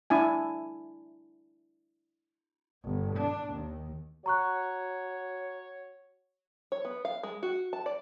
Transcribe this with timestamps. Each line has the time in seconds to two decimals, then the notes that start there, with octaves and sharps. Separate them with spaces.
0.10 D4 E4 G#5
2.84 G1
3.17 D4
3.54 D#2
4.26 F#4 C#5 A#5 C#6 F#6
6.72 C#5
6.85 B3
7.05 F5
7.23 G#3
7.43 F#4
7.73 A5
7.86 D5